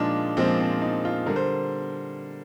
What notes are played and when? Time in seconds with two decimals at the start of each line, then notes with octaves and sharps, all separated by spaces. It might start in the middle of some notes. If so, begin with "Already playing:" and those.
Already playing: A#2 F3 G#3 D4 D#4 F4
0.37 A#2 F3 G#3 C4
0.60 C4
0.82 D#4
1.05 F4
1.26 D3 G3 A#4
1.36 C5